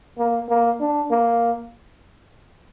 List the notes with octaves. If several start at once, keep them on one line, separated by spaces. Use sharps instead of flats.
A#3
A#3
D4
A#3